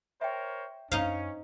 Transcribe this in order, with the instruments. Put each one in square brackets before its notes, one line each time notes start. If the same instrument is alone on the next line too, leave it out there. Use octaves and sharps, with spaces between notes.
[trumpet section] A#4 C5 C#5 [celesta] E5 G5
[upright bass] F#2 A#3 [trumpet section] C#4 [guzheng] D#4 F5 [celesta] C5